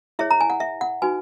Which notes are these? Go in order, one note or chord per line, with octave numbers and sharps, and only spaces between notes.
E4 G#4 C#5 E5
A#5
G#5
F#5
E5
F#5
D#4 F#4 B4 G#5